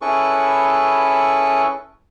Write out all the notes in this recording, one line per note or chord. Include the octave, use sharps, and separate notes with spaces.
C#4 E4 G#4 A4 B4 C#6